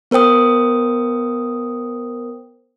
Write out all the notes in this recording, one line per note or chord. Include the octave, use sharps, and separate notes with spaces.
B3 A#4 C5 G5 D#6